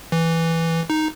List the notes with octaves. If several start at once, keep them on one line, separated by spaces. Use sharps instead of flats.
E3
D#4